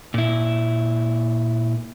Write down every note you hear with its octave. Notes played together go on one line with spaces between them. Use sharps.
A#2 E4